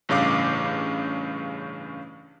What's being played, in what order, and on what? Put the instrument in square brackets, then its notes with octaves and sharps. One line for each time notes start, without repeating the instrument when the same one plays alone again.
[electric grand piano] A1 G2 C#3 F5 D6